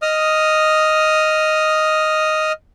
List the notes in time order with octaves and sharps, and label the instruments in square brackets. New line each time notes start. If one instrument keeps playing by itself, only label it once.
[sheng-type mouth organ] D#5 D#6 F6